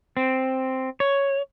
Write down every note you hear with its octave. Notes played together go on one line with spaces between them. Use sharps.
C4
C#5